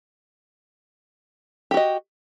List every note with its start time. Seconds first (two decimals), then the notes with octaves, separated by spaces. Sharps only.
1.71 G4
1.74 F#4
1.77 D#5